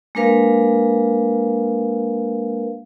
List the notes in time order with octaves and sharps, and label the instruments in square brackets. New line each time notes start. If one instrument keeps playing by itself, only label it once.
[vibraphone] G#3 A#3 D4 A#4 B4 F5